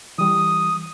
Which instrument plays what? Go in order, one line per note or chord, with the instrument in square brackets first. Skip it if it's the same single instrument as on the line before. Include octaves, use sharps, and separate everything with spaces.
[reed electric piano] E3 G3 [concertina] D#6